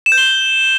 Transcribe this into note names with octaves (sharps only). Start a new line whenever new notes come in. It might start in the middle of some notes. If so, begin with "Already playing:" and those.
E7
G6
G7